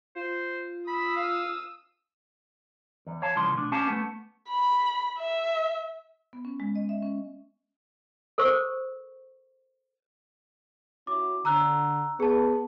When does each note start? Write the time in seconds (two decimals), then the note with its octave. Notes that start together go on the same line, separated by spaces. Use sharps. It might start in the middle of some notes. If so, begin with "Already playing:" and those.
0.15 F4 C5
0.87 B5 D#6 E6
1.16 F5
3.07 E2
3.22 C#5 F5 A5
3.36 C2 C#3 E3 F3 C6
3.55 B2 A3 D4
3.72 C#4 G4 F5 A5
3.87 A3 B3
4.49 B5
5.19 E5
6.33 B3
6.45 C#4
6.60 G#3
6.75 D#5
6.89 E5
7.03 C#4
8.38 A4 A#4 C5 C#6
11.07 C#4 E4 F#4 D6
11.45 D3 A#5 E6 F#6
12.20 B3 G#4 A5